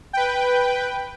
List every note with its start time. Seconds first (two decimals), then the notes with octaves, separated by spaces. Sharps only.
0.13 B4 G5